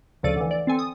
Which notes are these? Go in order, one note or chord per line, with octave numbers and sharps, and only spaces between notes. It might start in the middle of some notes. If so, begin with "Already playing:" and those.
D2 C#3 F3 A4 D5 D#7
D3 E3
D5
C4 A4 G#5
D#6